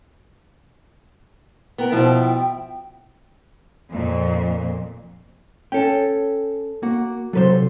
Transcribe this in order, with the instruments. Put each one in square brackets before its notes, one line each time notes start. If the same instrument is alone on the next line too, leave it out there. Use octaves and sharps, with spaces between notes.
[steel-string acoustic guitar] B3 A#4 [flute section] G5
[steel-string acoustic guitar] B2 F3 E4
[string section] F2 A#2
[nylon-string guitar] C#4 A4 [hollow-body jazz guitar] G5
[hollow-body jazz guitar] A#3 [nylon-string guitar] F#4
[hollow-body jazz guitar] C3 F#3 [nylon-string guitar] A4 B4 C5